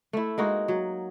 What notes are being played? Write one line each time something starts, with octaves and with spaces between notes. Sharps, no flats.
A3 E4
G#3 A#3 D#4 F#4
F#3